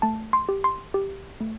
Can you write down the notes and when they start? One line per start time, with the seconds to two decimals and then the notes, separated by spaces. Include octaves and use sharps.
0.02 A3 A5
0.33 C6
0.49 G4
0.64 C6
0.94 G4
1.41 A3